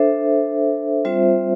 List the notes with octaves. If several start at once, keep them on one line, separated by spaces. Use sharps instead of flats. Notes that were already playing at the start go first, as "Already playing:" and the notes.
Already playing: D4 A4 C5 E5
G3 C4 F4 C5 E5